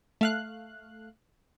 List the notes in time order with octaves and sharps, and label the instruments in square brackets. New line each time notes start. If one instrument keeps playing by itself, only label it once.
[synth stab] A3 F5 F#6